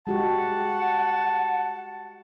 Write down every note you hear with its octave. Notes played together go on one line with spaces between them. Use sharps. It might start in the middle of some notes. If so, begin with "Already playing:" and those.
G#3 F#4 G4 F#5 A5